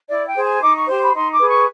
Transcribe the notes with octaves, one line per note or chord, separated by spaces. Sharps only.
E4 D5
G5
G#4 C5
G#5
D#4 D6
C#6
G4 C5 C6
B5
D#4 C6
D6
G#4 B4
C#6